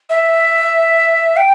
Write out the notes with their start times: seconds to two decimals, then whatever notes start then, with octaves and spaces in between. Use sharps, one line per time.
0.09 E5
1.36 G5